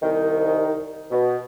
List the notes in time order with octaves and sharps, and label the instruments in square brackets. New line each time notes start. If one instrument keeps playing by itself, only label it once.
[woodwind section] C2 D#3
B2